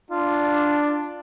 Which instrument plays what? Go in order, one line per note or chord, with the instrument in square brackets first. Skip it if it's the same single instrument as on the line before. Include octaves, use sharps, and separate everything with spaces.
[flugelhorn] D4 [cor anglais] F4